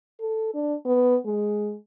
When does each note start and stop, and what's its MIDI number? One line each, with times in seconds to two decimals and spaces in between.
0.21 0.52 69
0.54 0.75 62
0.85 1.16 59
1.25 1.76 56